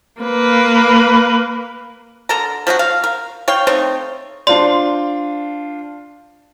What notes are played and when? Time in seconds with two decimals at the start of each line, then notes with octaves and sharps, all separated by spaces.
0.22 A#3 B4
2.29 D3 A4 A#4 A#5
2.67 F3 F#3 D#4 F#4
2.79 F5
3.04 A#4
3.48 C#5 F5 G5
3.67 A3 C4 D#4 C#5
4.47 D4 F4 C5 D5 C6